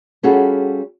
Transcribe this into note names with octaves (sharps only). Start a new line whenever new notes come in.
G3 C#4 F4 F#4 G#4 A4